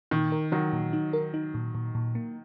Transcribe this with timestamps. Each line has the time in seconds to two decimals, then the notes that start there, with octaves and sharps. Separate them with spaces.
0.11 A#2 D#3
0.32 A#4
0.52 D#3 F#3 A#4
0.73 A#2
0.93 D#4
1.13 A#4
1.34 D#4
1.54 A#2
1.75 A#2
1.95 A#2
2.15 A#3